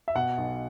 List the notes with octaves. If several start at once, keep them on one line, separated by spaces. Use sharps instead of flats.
E5
B2 F#5
B1